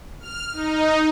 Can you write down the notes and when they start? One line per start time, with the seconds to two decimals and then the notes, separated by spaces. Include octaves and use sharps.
0.20 F6
0.53 D#4